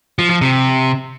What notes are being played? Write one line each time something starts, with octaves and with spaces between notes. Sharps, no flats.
F3
F3
C3